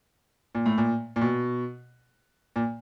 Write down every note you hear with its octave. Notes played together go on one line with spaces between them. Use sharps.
A#2
A2
A#2
A#2
B2
A#2